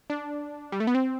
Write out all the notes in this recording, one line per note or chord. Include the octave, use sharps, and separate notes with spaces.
D4
G3
A3
B3
C4